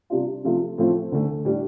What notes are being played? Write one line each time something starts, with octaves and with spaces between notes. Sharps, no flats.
C3 G3 D4 F4
C3 F3 A3 F4
A2 F3 A3 C4 F4
D2 D3 A3
A2 G3 D4